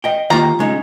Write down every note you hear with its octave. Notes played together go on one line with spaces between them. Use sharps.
D#5 G5
D#3 A#3 F4 G4 A#5
C#3 G#3 D#4